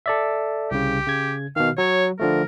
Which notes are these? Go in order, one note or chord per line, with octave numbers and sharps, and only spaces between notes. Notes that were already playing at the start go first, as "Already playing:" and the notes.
A4 D5 E5
C2 C#3 G4
C#3 G#6
B2 D#3 F5
F#3 C#5
D3 F3 A3 A#4